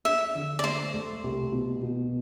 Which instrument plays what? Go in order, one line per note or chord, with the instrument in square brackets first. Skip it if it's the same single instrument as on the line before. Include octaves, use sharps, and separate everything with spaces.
[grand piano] D4 [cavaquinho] E5
[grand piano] D3
[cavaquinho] D5
[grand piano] A3 [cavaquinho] C5
[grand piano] A3
C2
B2
B2